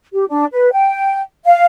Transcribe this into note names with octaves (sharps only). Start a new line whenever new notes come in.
G4
D4
B4
G5
F5